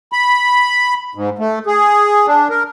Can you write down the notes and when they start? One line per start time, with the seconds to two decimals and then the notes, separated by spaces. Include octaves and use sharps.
0.12 B5
1.15 G#2
1.39 A3
1.66 G#4
2.27 D4
2.50 A#4